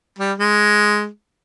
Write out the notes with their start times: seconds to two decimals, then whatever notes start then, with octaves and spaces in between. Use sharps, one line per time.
0.18 G3
0.38 G#3